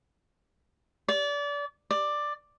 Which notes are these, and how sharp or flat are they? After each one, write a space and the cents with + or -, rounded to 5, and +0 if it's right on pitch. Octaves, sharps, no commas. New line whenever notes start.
D5 -30
D5 +10